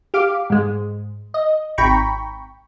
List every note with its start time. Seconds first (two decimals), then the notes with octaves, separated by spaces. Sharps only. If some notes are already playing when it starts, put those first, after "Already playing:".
0.14 G4 F5 D6
0.50 G#2 G#3
1.34 D#5
1.78 G#1 G5 A#5 B5 C#6